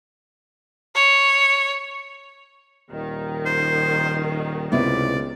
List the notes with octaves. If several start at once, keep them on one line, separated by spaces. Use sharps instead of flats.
C#5
D#1 D#3
C5
C#2 C3 B3 E4 D5